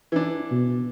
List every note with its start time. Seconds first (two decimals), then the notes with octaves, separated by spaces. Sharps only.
0.12 E3 D4
0.52 B2